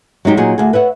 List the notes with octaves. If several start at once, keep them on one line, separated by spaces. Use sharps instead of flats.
F#3 G#3 D#4 G4
A#2 F#3 D#4 G#4
D2 G#4
B4 C#5 E5 F#5